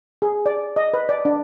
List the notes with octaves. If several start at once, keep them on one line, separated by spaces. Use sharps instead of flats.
G#4
D5
D#5
B4
D5
D4